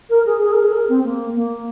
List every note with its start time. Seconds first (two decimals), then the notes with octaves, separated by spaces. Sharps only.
0.10 A#4
0.26 G#4
0.42 G#4
0.52 A#4
0.63 G#4
0.73 A#4
0.89 C4
1.04 A#3
1.36 A#3